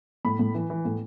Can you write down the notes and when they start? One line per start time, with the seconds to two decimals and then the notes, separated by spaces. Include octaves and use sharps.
0.25 A2 B5
0.39 A2
0.55 E3
0.70 E3
0.85 A2